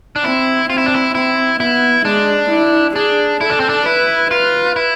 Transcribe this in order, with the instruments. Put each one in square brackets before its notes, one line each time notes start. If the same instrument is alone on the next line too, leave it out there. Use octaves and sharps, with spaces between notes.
[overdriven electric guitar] D4
[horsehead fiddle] C4 [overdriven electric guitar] E4
[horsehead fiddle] C4 [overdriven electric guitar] F4
[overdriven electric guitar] E4
D4
E4
[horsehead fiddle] C4 [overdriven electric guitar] E4
[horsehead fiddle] B3 [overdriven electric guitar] E4
[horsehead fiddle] G#3 [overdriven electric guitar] D4
[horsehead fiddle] E4
[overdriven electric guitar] D4 [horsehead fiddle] G#4
[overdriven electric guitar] E4 [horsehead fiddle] A4
[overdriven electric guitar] D4
C4
D4
[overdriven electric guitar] E4 [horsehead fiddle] B4
[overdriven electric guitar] F4 [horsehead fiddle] B4
[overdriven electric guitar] E4